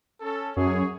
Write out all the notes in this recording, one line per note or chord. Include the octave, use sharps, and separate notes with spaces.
C#4 A4
F#2 G#4 C#5